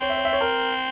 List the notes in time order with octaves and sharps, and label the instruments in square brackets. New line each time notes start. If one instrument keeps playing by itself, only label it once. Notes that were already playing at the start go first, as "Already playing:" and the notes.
[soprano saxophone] C4 [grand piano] C#5
[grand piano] E5
C#5
E5
C#5
A#4